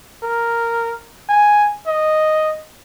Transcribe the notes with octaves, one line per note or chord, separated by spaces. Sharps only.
A#4
G#5
D#5